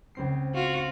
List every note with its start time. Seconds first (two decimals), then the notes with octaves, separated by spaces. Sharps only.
0.15 C#2 C4 C7
0.54 F4 F#4